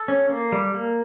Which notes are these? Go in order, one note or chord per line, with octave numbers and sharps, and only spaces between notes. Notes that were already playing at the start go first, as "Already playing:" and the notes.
Already playing: A4
C#4
A#3
G3
A#3